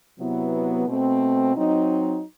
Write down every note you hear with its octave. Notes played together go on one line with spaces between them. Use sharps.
C3 F#3 B3 E4
B2 A3 C4
F#3 C4 D#4